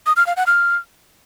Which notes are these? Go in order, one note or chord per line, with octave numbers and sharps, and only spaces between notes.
D#6
F6
F5
F#5
F6